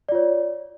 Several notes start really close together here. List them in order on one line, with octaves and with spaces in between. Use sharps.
D5 F4 C#5